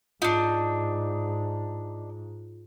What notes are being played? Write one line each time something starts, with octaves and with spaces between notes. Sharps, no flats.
G#2 D4 D#4 F4